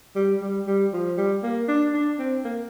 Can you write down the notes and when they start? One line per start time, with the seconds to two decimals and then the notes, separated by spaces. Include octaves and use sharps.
0.16 G3
0.42 G3
0.67 G3
0.93 F3
1.17 G3
1.43 A#3
1.68 D4
1.94 D4
2.19 C4
2.44 A#3